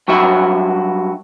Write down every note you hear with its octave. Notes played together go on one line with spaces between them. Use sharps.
G2 F#3 F#4 E5